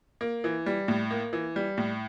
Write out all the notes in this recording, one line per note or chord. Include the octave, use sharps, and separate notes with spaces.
A#3
E3
G3
A2
A#3
E3
G3
A2